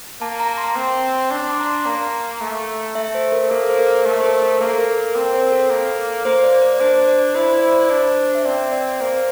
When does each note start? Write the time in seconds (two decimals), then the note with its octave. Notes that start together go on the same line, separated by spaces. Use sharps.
0.21 A#3 A5
0.40 A#5
0.58 C6
0.76 C4
1.31 D4
1.43 C6
1.49 D6
1.60 A#5
1.67 C6
1.85 A#3 A#5
2.41 A3
2.95 A3 E5
3.15 C5
3.32 A#4
3.50 A#3 A4
3.70 C5
3.78 A#4
4.06 A3
4.20 C5
4.24 A#4
4.42 A4
4.60 A#3 A4
4.78 A#4
4.97 A#4
5.15 C4 A#4
5.34 C5
5.52 A4
5.71 A#3
6.25 A#3 C5
6.44 D5
6.62 D5
6.80 D4 C5
7.08 D5
7.35 E4 C5
7.48 D5
7.60 C5
7.72 D5
7.83 C5
7.90 D4
8.35 E5
8.45 C4 D5
8.72 D5
9.00 A#3 C5